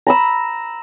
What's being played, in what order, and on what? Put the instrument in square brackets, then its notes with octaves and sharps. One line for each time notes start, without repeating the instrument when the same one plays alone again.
[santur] A#5 B5 E6